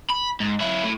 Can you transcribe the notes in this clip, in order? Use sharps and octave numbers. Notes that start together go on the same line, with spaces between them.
B5
G#2
F#3 E4
A2